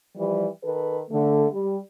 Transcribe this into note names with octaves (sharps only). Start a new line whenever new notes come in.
E3 F3 G3
D#3 A4 B4
D3 A3
G3